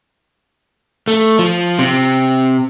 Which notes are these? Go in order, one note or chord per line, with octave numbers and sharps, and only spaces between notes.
A3
F3
C3